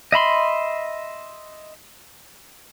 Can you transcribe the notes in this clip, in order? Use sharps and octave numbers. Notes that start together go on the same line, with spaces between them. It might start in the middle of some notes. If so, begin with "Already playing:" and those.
D#5 E5 B5 C6